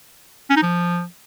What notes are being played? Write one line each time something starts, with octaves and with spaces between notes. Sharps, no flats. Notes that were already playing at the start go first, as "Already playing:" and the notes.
C#4
D#4
F3